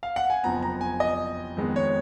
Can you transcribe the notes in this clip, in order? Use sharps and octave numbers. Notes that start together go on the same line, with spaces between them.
F5
F#5
G#5
F#1 F2 F3 B3 A#5
A#5
G#5
D#5
F2 D#3 G#3 B3
C#5